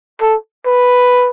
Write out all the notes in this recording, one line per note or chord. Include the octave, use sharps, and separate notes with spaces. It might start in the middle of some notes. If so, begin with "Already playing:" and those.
A4
B4